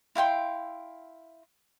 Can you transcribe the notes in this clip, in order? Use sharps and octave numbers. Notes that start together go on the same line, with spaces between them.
E4 F5 G5 C6